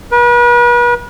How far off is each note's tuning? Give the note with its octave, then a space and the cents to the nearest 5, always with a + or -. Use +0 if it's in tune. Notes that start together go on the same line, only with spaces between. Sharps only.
B4 -40